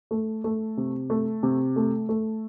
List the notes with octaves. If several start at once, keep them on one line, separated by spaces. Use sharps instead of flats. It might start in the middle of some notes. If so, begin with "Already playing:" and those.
A3
A3
C3
A3
C3
A3
A3